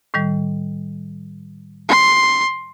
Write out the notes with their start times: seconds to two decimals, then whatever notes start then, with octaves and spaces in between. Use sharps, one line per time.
0.14 A2 D#3 G3
1.89 C6